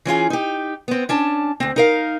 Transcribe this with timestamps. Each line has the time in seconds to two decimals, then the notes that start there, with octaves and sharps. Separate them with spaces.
0.05 E3 C#4 F4 G#4
0.30 D#4 G4
0.88 B3 C4
1.09 C#4 D4 A5
1.60 D2 C4
1.76 D#4 A#4 F5